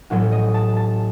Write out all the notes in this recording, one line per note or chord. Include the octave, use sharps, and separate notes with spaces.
A1 A2 F#3 A3 F#4
D#5
A5
A5